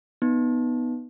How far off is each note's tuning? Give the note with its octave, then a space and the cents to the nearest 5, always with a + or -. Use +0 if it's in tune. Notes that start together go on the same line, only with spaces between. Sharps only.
B3 +0 D#4 +0